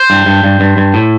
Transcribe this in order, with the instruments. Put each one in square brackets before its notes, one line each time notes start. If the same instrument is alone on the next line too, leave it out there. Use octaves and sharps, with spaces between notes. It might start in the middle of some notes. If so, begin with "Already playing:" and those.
Already playing: [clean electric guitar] C5
G2
G2
G2
G2
G2
A2